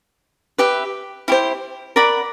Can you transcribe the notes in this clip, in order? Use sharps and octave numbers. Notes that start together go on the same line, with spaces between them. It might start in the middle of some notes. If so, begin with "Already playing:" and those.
G4 B4 E5
E4 G4 C5
A#4 D5 F#5 B5